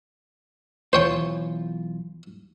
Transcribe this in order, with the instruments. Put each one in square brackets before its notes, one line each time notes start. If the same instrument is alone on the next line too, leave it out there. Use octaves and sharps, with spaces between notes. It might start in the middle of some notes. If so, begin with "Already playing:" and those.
[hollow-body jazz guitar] B1 E3 F4 [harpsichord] C5 C#5 G5